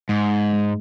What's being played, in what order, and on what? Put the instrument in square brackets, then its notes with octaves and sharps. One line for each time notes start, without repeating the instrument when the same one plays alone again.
[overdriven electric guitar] G#2 [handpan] G#3
[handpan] G#3